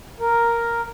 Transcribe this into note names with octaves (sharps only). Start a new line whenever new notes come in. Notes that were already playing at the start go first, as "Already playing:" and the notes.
A#4